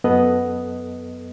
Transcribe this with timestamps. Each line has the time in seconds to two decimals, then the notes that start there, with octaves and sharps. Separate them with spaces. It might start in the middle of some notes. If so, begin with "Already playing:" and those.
0.04 F#2 B3 A4 D#5 F#6